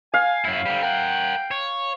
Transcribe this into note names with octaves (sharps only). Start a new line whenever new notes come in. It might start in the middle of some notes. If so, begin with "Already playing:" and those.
F5 G#5
F#2 E4
D3 G3 C5
A#4 F#5 G5
C#5